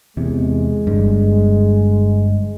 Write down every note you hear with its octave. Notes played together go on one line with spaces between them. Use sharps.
E2 C3 G#3
G1 G2